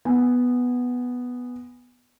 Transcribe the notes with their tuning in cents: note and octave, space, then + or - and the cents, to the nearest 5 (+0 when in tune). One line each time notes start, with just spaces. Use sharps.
B3 +0 G#5 -20